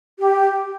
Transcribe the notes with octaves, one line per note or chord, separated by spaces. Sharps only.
G4